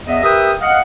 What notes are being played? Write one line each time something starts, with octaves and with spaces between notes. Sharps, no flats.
E2 B3 D#5 E5
G4 A#4 B4 E5 G5 D#6
D#5 F5 F#5